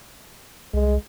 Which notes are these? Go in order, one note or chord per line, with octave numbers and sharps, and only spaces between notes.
C2 G#3